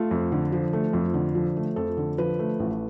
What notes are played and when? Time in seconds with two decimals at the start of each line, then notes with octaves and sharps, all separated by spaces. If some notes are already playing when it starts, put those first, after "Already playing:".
Already playing: A3 F4
0.11 F2
0.32 D3
0.52 F3
0.73 A3
0.93 F2
1.14 D3
1.35 F3
1.56 A3
1.76 F2 A4
1.97 D3
2.18 F3 B4
2.39 A3
2.60 A1